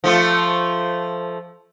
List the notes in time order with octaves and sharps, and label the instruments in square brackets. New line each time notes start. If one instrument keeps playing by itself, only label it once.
[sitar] F3 A3 F4